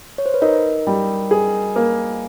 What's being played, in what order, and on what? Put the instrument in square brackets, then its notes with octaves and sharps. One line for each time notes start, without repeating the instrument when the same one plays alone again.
[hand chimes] C#5
C5
B4
[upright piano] D#4 [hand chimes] A#4
[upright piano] G3
G#4
A#3